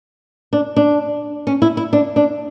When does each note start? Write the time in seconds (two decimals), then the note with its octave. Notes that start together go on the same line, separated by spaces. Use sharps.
0.53 D4
0.76 D4
1.47 C#4
1.62 E4
1.77 E4
1.93 D4
2.16 D4